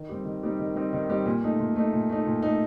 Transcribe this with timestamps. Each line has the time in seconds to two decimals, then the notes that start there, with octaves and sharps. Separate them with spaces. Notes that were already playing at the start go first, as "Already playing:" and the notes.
Already playing: D#3
0.09 G3 C4 D#4 G4
0.25 D#3
0.43 G3 C4 D#4 G4
0.59 D#3
0.76 G3 C4 D#4 G4
0.93 D#3
1.09 G3 C4 D#4 G4
1.25 A#2
1.42 A3 D#4
1.59 A#2
1.76 A3 D#4
1.93 A#2
2.09 A3 D#4
2.26 A#2
2.42 A3 D#4